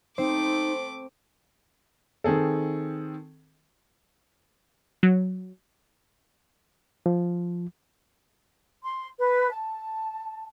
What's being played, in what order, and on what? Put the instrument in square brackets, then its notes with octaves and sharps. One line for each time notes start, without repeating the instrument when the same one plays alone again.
[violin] A3 D6 [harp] C4 [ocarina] D#4 [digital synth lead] C5
[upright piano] D#3 C4 G#4 A4
[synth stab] F#3
[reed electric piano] F3
[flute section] C6
B4
A5